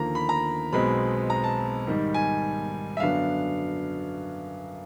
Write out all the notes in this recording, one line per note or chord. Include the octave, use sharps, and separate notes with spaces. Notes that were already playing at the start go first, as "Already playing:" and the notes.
Already playing: D#2 D3 F3 A#3 A#5
B5
A#5
B1 B2 G#3 C4 B5
A#5
A5
G#2 D#3 G3
G#5
E5
F#2 D3 F#3 B3 D4 F5